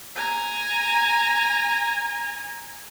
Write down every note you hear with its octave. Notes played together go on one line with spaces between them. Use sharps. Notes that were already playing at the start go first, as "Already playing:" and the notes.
G#5 A#5